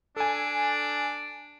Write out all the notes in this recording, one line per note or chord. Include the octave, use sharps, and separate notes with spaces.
D4 A4 G#5